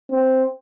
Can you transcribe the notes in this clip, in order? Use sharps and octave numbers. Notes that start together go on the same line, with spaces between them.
C4